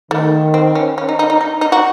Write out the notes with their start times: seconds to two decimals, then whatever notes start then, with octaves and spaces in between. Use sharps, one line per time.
0.11 D#3 A3
0.54 C4
0.75 C#4
0.98 C#4
1.09 D#4
1.19 D#4
1.30 D#4
1.41 D#4
1.61 D#4
1.72 F#4